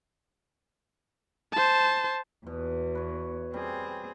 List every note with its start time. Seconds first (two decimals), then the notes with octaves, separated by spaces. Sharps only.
1.53 C5 A5
2.47 E2 B2
2.95 B4 C#5
3.54 G3 C4 G#4